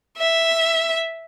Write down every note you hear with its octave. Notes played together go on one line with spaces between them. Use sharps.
E5